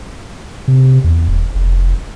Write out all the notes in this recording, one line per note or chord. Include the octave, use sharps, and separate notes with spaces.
C3
E2
D#1
F1